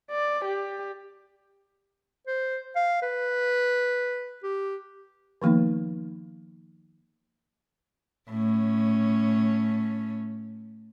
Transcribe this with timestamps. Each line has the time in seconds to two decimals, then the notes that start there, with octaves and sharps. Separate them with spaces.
0.11 D5
0.45 G4
2.27 C5
2.76 F5
3.02 B4
4.43 G4
5.42 D#3 F3 A#3 B3 D#4
8.30 A2 C#4